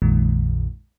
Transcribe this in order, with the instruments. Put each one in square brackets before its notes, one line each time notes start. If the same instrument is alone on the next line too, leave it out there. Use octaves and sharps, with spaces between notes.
[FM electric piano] A#1 F2 A#2 D#3 G#3